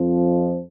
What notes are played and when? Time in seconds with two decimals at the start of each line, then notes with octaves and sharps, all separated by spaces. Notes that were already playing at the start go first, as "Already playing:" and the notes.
Already playing: F2 F3